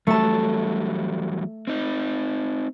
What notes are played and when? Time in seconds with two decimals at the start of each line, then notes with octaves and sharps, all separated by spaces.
0.07 E2 F#3 G3 A3 A5
1.67 C4 D#4